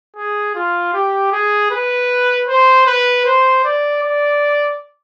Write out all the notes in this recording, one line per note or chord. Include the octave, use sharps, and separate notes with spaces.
G#4
F4
G4
G#4
B4
C5
B4
C5
D5
D5